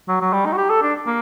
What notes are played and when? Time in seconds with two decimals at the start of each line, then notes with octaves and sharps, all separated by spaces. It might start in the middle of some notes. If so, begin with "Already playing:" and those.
0.08 F#3
0.21 F#3
0.33 G3
0.45 D#4
0.53 F#4
0.57 G4
0.70 A4
0.82 D4
1.06 A#3